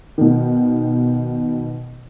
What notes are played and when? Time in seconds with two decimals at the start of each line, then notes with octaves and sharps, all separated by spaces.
0.18 B2 D#3